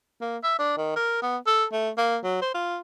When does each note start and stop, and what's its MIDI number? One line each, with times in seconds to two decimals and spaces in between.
0.21 0.37 58
0.43 0.55 76
0.59 0.75 62
0.77 0.94 51
0.96 1.19 70
1.22 1.37 59
1.47 1.65 69
1.72 1.89 57
1.97 2.18 58
2.23 2.40 54
2.41 2.52 72
2.54 2.79 65